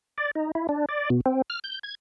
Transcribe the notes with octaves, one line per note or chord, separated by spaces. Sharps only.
D5
D#4
E4
D4
D5
B2
C4
F6
G6
G#6